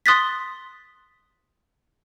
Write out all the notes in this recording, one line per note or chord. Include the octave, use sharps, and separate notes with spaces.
C6 D#6 F#6 A6 B6